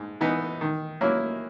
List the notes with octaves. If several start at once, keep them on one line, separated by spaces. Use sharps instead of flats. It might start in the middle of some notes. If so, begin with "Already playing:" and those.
Already playing: G#2
E3 B3 D#4
D#3
F#3 A#3 C#4 E4